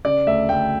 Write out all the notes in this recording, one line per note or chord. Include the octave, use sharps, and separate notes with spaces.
C#3 D5
D2 E5
D2 G5